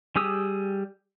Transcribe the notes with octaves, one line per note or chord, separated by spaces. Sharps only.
G3 G4 G#4 D#6 E6